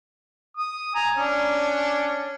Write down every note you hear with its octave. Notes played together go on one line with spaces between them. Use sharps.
D#6
G#5 A#5
C#4 D4